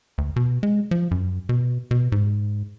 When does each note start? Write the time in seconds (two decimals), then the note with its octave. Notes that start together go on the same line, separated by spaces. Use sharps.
0.18 D2
0.36 B2
0.63 G#3
0.91 F3
1.11 F#2
1.49 B2
1.91 B2
2.12 G#2